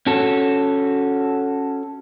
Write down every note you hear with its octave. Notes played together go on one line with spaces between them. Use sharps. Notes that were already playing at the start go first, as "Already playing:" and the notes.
C#4 F#4 A4